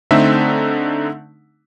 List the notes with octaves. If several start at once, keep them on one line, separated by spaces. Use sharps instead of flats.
D3 A3 C4 D#4 E5